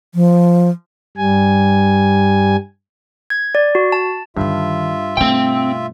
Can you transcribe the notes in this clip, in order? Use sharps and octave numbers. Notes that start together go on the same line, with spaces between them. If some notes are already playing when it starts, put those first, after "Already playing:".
F3
G2 G3 G#5
G#6
D5
F#4
A5
G2 D3 D#3 F4 E5
B2 A3 C4 G5